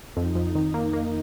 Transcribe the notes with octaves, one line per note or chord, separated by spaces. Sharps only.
F2 D#4
F2
D#3 D#4
A#3
A#3